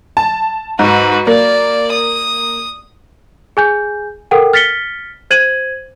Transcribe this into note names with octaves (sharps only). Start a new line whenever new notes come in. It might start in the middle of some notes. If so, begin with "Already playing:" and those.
A5
G#2 F#4 B4
A#3 D5
D#6
G#4 G#5 G6
A4 A#4 F#5 G5
F6 A6 B6 C#7 G7
C5 G#6 D#7 F#7